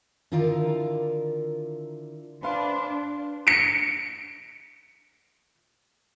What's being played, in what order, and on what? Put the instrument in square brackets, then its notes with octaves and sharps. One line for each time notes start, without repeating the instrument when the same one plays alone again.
[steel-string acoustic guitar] D3 D#3 E4 F4 A#4 D5
[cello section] D4 [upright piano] B4 C5 F5 [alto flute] C6
[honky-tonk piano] C#7 D7